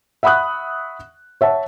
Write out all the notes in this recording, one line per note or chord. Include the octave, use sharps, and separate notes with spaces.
E5 F#5 B5 C#6 D#6 F#6
C#5 E5 F#5 A5